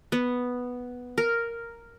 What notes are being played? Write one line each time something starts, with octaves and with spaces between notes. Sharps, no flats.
B3
A#4